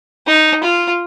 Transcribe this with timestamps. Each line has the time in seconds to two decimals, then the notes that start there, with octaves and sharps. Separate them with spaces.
0.27 D#4
0.63 F4